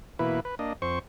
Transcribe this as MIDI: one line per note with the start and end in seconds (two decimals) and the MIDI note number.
0.19 0.40 47
0.19 0.40 52
0.19 0.40 58
0.19 0.40 64
0.19 0.40 71
0.45 0.55 71
0.59 0.73 58
0.59 0.73 62
0.59 0.73 75
0.82 0.99 41
0.82 0.99 60
0.82 0.99 72
0.82 0.99 85